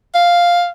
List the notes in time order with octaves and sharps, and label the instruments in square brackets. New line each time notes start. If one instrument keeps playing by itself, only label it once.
[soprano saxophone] F5